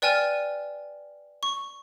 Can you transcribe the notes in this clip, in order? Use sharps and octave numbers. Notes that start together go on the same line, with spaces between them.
B4 D5 G5 G#5 F6 E7
C#6